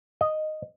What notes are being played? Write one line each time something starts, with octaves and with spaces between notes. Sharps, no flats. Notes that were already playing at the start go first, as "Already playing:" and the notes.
D#5